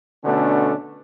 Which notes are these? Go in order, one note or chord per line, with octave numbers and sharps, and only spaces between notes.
B2 D3 A3 C#4 D4